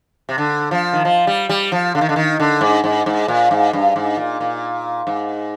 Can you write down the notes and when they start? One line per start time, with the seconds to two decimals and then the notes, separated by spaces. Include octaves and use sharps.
0.29 C3
0.38 D3
0.71 F3
0.93 D#3
1.05 F3
1.27 G3
1.49 G3
1.72 F3
1.95 D3
2.01 D#3
2.09 D3
2.16 D#3
2.40 D3
2.61 G#2
2.84 G#2
3.06 G#2
3.28 A#2
3.51 G#2
3.73 G2
3.96 G#2
4.17 A#2
4.40 A#2
5.07 G#2